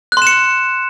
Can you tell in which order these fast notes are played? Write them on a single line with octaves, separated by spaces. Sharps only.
F#6 C6 E7 C#7